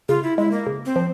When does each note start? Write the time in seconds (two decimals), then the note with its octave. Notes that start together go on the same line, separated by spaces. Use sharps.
0.09 C#3 F4
0.23 E4
0.38 G#3 E4
0.51 A#3
0.67 C#3
0.86 C4
0.96 F3